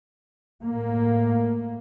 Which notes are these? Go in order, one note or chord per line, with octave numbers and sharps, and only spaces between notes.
A2 A#3